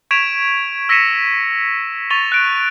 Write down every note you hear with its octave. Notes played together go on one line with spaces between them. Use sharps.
C#6 G#6 B6 D7 E7 F7
E6 A#6 B6 C#7 D#7 E7
C#6 A6 D#7 F7 G7
F#6 D7